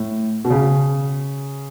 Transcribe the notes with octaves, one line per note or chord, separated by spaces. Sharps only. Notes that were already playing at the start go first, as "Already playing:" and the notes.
Already playing: A2
B2
C#3